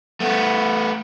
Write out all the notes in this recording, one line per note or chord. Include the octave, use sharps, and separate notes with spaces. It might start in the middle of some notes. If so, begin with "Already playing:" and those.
A3 B3